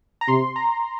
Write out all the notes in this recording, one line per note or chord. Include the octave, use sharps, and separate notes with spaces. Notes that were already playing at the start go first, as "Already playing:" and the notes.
A#5
C3 C6
A#5